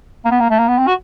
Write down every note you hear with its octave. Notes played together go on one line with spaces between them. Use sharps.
A#3
B3
A#3
A3
A#3
B3
C4
F#4